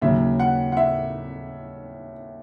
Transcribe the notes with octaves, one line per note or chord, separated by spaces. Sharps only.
D#2 C#3 F#3 E5
F#5
F#5
E5